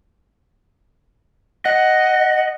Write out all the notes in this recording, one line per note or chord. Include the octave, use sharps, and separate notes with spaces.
D#5 F#5